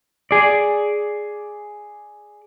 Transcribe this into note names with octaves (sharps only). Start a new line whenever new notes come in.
G#4 D5